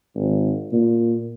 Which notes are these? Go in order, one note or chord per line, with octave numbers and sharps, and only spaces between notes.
G#1
A#2